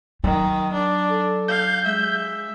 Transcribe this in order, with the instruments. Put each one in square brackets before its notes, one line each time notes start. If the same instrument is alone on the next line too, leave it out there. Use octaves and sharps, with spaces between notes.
[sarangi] D#3 [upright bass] F#3
[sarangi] D4
[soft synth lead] A4
[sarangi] F5 [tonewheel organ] G6
[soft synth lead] G#3 [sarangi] E5